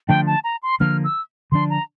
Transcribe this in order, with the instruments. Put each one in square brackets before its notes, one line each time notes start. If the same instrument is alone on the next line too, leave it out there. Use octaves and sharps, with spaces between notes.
[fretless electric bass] D3 F3 A3 D4 [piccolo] G5
[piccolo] A5
A#5
C6
[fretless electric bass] D3 F3 A#3 D4 [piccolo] F6
[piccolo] E6
[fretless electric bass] D3 F3 A#3 D4 [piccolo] C6
[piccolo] A#5